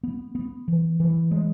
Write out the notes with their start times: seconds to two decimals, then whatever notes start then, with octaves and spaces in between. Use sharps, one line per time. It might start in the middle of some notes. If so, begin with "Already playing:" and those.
0.03 B3
0.35 B3
0.68 E3
1.00 E3
1.31 G#3